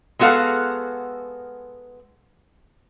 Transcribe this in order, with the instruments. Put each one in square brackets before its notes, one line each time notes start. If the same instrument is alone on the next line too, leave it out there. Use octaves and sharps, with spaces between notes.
[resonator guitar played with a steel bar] G#3 B3 F#4 A4 F5